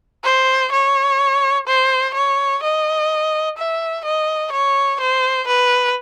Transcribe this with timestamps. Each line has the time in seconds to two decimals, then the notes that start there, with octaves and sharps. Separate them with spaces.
0.24 C5
0.72 C#5
1.67 C5
2.14 C#5
2.63 D#5
3.58 E5
4.05 D#5
4.52 C#5
5.00 C5
5.47 B4